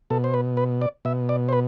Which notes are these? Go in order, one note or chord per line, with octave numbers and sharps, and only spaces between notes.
B2 A4
C5
B4
B4
D5
B2 E5
D5
C5
B4